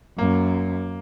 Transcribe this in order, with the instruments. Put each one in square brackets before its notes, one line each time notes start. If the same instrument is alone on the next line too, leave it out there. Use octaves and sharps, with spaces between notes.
[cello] F#2 [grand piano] A#3